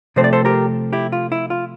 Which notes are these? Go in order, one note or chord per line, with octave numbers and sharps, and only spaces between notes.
C3 F3 A3 C4 C5
D5
A4 C5
G4 A#4
E4 G4
F4
E4
F4